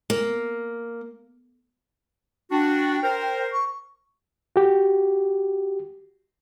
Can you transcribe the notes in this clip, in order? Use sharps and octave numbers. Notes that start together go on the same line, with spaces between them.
A#3
D4 F#4 G5
A#4 C5
C#6
F#4 G4